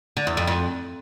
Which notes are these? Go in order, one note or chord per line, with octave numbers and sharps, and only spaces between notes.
D3
E2
F2
F2